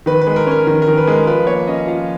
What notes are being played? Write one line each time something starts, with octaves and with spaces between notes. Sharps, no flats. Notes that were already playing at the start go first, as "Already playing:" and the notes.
D#3 B4
B4
G#3
A#4
C#4 A#4
D#3 A#4
A#4
D#3
B4
G#3 A#4
F3 B4
A#3 C#5
C#4 D#5
F3 F5